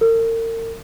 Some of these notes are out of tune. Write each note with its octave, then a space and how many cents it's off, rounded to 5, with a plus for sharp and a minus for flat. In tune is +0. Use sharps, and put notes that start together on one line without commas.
A#4 -40